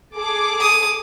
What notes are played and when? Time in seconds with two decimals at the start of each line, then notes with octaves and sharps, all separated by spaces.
0.16 G#4 A4 D6
0.60 D#6